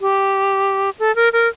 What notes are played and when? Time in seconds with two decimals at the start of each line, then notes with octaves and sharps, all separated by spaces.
0.01 G4
0.99 A4
1.16 A#4
1.33 A#4